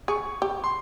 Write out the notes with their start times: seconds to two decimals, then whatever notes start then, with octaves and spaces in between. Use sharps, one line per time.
0.08 G#4 C#6
0.42 G4
0.64 C6